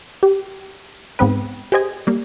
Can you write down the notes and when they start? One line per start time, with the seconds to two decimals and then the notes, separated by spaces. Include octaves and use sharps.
0.23 G4
1.19 G#2 B3 C4 B4
1.72 G4 G#4 C5 D#5 G#5
2.07 G3 A#3